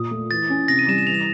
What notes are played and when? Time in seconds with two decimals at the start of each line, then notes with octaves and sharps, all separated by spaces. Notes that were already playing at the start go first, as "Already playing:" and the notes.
Already playing: A#2 D#6
0.11 A3
0.31 E3 A6
0.50 C#4
0.68 C3 A#6
0.79 D#7
0.88 G3 E7
0.98 E7
1.07 E3 F7
1.14 E7